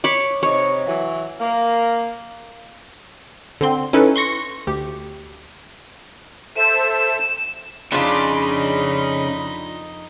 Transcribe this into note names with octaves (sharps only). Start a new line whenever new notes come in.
C#5 B5 D6
C3 D#4 C#5
E3 F#3
A#3 A#4 F5
D3 C4 C6
C#4 D#4 E4 A4 B4
C6 C#6 A#6 C#7
D2 G4
A4 C5 E5 E7
F2 C#3 D4 D#4 F4 D5 D#5 B5